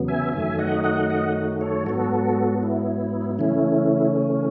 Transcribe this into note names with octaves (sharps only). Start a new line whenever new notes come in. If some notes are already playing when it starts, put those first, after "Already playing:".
Already playing: E2 C#3 F#3 B3
E5 G#5
F#2 D#3 F#3 A3 E5 G#5
D#5 F#5
D#5 F#5
D#5 F#5
A4 C#5
G#2 F#3 B3 F#4 A4
E4
C#3 E3 A3 C#4 E4